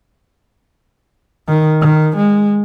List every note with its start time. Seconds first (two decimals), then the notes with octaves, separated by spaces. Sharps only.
1.48 D#3
1.81 D#3
2.17 G#3